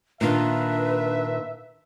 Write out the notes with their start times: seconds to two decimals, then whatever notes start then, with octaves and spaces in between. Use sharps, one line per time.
0.21 A#2 D#3 D4 F4 B4 E5